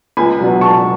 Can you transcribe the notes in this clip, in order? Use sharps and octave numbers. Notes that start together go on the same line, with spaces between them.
C#2 G#5 B5
B2 F#3 B3 D4
C#2 A5 C#6